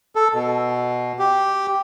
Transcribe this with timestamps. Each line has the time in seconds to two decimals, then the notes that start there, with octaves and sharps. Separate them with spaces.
0.16 A4
0.34 B2
1.19 G4